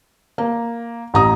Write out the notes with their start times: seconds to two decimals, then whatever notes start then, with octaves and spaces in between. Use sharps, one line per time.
0.38 A#3
1.14 A1 A#5 D#6